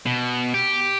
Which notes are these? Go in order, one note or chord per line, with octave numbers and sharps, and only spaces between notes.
B2
G4